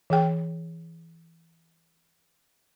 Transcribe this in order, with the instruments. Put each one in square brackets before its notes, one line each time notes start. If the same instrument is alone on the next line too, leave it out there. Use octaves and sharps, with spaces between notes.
[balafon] E3 G#4 G5